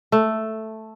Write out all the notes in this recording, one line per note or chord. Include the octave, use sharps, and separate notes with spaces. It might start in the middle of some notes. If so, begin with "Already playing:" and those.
A3